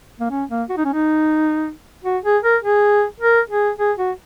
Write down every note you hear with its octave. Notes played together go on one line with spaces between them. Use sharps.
A#3
C#4
A#3
F#4
D#4
C#4
D#4
F#4
G#4
A#4
G#4
A#4
G#4
G#4
F#4